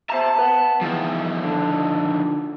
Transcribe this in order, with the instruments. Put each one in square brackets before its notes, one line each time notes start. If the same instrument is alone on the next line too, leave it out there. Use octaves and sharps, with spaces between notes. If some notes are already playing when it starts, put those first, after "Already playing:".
[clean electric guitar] C5 E5 A#5 [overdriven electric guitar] A5
[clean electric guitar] B4 F#5
[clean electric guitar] E2 [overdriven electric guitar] D#3 F3
[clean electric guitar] D3